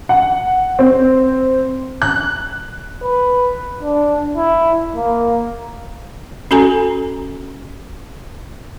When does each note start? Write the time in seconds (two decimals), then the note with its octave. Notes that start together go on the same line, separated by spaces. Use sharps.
0.09 F#5
0.79 C4
2.02 F#6
3.03 B4
3.82 D4
4.36 E4
4.96 A#3
6.51 C#4 F#4 A4 G#5 A#5